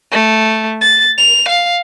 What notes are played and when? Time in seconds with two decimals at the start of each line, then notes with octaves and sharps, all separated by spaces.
0.12 A3
0.81 A6
1.18 F7
1.48 F5